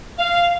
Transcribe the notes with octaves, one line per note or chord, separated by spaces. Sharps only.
F5